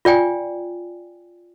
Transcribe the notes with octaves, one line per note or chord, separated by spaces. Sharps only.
F4 D5 G5 G#5